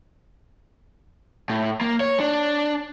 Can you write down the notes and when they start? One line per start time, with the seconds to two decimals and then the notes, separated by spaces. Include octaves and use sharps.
1.50 A2
1.81 A#3
2.00 C#5
2.20 D4